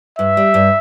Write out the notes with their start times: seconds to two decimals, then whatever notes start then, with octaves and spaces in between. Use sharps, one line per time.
0.19 G2 E5
0.37 G3
0.54 G2